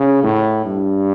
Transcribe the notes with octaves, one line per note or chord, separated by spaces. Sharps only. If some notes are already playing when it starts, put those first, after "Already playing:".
Already playing: C#3
A2
G2